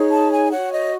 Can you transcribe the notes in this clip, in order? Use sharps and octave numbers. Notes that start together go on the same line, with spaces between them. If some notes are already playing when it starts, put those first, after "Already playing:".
Already playing: D#4 G#4 C#5
A5
G#5
F#4 C#5 F#5
D#5